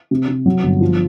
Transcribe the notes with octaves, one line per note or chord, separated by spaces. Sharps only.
C3
C3
F#3
G1
F3